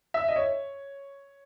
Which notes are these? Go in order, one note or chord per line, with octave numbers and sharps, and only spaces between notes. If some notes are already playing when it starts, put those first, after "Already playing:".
E5
D#5
C#5